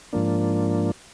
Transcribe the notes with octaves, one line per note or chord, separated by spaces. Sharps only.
G#2 F3 A#3 D4